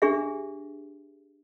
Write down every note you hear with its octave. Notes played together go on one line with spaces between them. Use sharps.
D4 G4 G#4 E5